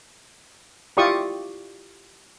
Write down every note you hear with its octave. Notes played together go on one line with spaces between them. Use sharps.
E4 F4 G4 D5 C#6 D#6